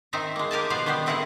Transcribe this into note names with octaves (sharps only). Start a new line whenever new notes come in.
D#3 C4 D#4 C5 E5 G#5
G#3 A#3
G4 A#4 G#5 A5
B2 F3 B4 C5 D#5 F5
D#3 G3 B3 G4 C5
A2 C4 E4 G#4 A#4 F#5